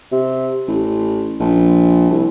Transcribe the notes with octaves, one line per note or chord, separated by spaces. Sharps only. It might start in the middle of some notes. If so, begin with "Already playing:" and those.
C3
A1
A#1
C2